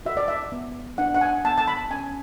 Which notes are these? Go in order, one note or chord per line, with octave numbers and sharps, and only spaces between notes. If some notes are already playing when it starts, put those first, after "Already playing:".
F#4 E5
D5
E5
B3
D4 F#5
F#5
G#5
B3 A5
A5
B5
C#4 G#5